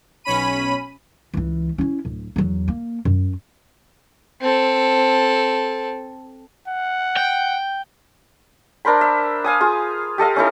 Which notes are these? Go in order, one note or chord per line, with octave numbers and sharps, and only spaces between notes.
B1 C#4 B5 D#7
C#2 E3
C#4 E4
D1
E2 F#3
A#3
F#2
C4 A4
F#5
G5
D4 A#4 C5 B5
E5
F5 G#5 D#6
F4 G#4
G4 A4 D#5 F5
C#4 D#4 E4 A4